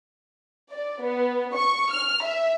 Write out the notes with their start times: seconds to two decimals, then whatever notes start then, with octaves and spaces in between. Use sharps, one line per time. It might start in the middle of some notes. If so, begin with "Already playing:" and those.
0.72 D5
1.02 B3
1.56 C#6
1.92 F6
2.24 E5